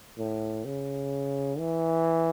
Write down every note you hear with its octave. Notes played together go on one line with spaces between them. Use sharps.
A2
C#3
E3